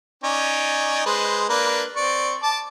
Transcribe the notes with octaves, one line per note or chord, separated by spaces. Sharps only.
C#4 D#4 D5
G#3 B4 C5
A#3 D4 B4
C4 D5 C#6
A5 D6